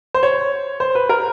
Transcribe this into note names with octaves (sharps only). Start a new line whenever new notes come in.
C5
C#5
C5
B4
A#4